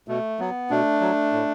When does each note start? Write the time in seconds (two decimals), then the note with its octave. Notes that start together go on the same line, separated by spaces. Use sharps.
0.08 B2 A3
0.39 F#3 B3
0.70 B2 A3 D4
1.01 F#3
1.33 A2